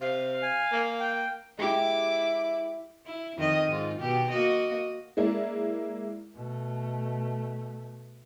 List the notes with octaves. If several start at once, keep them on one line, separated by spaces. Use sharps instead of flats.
C3 F5
G#5
A#3
G5
G#3 E4 G4 D6
E4
F2 D#3 D#5
G#2 F4
B2 G4
A#3 F#4 D#5
G#3 A#3 E4 D5
B2 A3